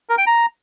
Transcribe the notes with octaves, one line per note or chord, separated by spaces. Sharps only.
A#4
G5
A#5